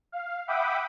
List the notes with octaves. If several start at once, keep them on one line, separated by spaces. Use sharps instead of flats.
F5
E5 F#5 G5 B5 D6 D#6